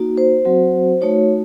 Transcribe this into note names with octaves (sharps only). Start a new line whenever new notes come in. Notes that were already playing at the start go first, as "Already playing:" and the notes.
Already playing: A#3 D#4 F#4
C5
F#3 C4 F#4
A3 D#4 F#4 C#5